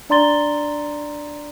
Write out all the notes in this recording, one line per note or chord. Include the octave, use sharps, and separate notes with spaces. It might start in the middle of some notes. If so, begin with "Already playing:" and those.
D4 D5 A#5 C6 A6 G7